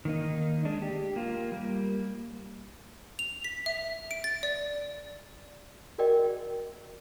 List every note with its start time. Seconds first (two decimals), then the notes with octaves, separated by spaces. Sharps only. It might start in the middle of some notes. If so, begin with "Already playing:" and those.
0.05 D#3 A#3 D#4
0.65 G#3 D4
0.82 G4
1.16 A#3 F4
1.52 G3 A#3
3.19 F7
3.44 B6
3.66 E5
4.11 D7
4.24 A6
4.43 D5
5.98 F#4 G#4 A#4 D5 D#5 G5